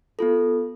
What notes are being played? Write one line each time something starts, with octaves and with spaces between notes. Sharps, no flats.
B3 F4 A4